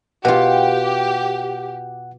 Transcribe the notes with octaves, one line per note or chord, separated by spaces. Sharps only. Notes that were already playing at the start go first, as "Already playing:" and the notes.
B2 F4 G4 F#5